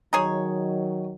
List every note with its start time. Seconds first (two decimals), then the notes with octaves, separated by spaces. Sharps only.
0.13 D#3 F#3 D#4 G#4 C#5